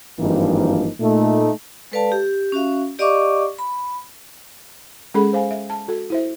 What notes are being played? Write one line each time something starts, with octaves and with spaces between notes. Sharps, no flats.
G#1 G2 E3 F3 A#3 D#4
A#2 A3 D#4
G#3 A4 B4 D5 F5 A5
G4
C#4 F#4 E5 F5
G4 D5 D#5 F5 C#6 D6
B5
G#3 C#4 G#4 A4 B5
C5 F5 G#5
E5
A5
F#4 A4
E4 C5 E5